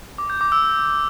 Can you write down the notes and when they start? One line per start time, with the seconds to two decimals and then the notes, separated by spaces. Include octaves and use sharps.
0.18 D6
0.30 G6
0.41 D6
0.52 E6